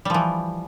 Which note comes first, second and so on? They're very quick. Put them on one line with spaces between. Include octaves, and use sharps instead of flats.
G3 F3 E3